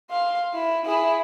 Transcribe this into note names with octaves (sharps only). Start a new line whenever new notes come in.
F5 C6
E4
E4 G#4